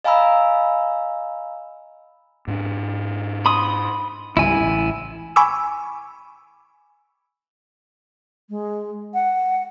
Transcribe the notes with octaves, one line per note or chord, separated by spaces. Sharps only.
D#5 F5 G#5 A#5 B5 E6
G#2 D4
B5 C6 D#6
C#2 G#2 G3 E4 G#5
A1
G#5 B5 C#6 D6 E6
G#3
F#5